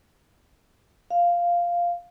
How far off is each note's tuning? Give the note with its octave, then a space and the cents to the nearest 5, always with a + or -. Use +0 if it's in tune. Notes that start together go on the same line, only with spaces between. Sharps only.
F5 -5